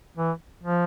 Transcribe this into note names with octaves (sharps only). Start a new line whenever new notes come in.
E3
F3